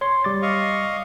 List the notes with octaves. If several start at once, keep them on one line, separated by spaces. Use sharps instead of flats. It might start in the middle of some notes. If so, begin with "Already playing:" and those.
C#5 C6
G3 D6 A6
D#5 F5 C#6